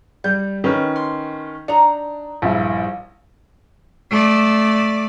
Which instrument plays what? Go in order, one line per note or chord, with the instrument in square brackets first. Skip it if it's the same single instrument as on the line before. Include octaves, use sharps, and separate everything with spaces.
[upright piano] G3 [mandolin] G6
[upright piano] D#3 C#4 B4
[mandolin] C6
[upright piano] D4 [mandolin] D#4 A#5
[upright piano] A#1 G2 E4
[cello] A3 D5